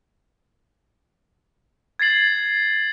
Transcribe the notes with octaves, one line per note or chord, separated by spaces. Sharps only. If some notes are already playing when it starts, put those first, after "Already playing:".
G#6 A6 C7 F#7